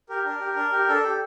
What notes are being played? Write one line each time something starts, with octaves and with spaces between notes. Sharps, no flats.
G4 A#4
D4 A#4
G4
D4
G4
D4 A4
G4